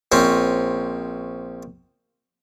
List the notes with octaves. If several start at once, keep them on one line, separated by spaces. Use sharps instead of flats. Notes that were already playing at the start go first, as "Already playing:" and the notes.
A#1 C4 C#4